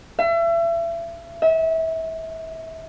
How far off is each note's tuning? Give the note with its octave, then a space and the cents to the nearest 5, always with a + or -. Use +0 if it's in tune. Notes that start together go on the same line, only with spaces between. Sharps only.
E5 +35
E5 -30